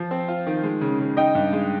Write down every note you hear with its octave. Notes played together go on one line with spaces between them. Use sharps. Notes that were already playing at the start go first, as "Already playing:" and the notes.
Already playing: F3
C4
F4
D#3
G#3
C#3
C#3
D#4 D#5 G5
G2
G#3